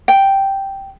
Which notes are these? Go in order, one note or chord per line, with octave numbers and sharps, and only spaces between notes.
G5